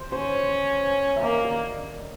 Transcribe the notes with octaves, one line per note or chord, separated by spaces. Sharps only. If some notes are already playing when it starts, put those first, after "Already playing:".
Already playing: C5
C#4 C5
E5
A#3 D#5
D5